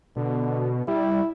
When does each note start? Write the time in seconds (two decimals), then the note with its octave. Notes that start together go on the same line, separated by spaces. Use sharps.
0.17 B2 D3
0.88 G3 E4